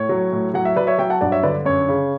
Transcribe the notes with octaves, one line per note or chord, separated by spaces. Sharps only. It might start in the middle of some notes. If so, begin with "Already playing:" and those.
Already playing: A2 C#5
F#3
A2
F#3 F#5
E5
F#3 B4 D5
C#5 E5
F#3 E5 G5
F#5 A5
G2 D5 F#5
C#5 E5
D3 B4 D5
F#2 C#5
C#3